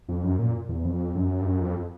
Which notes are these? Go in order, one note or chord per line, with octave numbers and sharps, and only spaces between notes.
F2
F#2
A#2
E2
F2
F#2
G2
F#2
F2